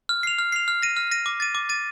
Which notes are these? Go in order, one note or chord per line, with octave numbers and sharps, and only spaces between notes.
F6
C7 F7
F6
C7 F7
F6
A#6 D#7
F6
A#6 D#7
D6
A6 D#7
D6
A6 D#7